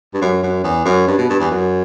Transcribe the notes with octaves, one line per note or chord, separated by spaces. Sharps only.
G2
F#2
F#2
E2
F#2
G2
B2
G2
E2
F#2